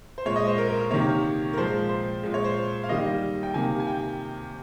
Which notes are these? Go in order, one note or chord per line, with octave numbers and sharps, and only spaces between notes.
C5
A#2 G#3 C#5
D#5
C5
A#4
A#4
A#4
C3 D#3 A#3 C#5
A#4
A#2 F3 G#3 C5
C5
A#2 G#3
C#5
C5
F5
D#3 G3 A#3 D#5
G5
C3 D#3 A#3 G#5
G#5
G5